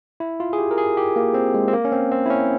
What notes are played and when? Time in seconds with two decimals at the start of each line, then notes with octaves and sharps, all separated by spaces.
0.20 E4
0.40 F4
0.53 G#4
0.58 G4
0.71 A#4
0.78 G#4
0.97 G4
1.16 A#3
1.34 C4
1.54 G#3
1.68 C4
1.73 A#3
1.85 C#4
1.92 C4
2.12 C4
2.26 E4
2.30 C#4